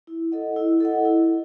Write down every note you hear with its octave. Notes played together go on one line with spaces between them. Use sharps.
E4
A4 D#5 F#5
E4
A4 D#5 F#5
E4